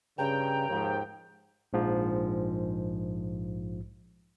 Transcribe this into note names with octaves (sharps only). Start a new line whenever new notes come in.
G2 C#3 G5 A#5
D#2 G#2 F3
A#1 G#2 F3